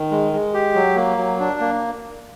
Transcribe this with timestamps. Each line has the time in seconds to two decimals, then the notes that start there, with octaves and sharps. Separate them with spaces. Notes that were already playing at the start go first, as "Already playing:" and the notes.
Already playing: D#3
0.11 G#3
0.33 G#3
0.54 G4
0.75 F#3
0.96 A#3
1.18 F#3
1.40 D4
1.60 A#3